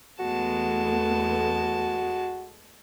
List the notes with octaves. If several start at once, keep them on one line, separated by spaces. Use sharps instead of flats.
E2 G#3 A3 B3 F#4 A5